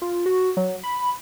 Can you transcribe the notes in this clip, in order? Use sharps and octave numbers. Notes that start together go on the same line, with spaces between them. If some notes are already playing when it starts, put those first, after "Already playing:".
F4
F#4
F#3
B5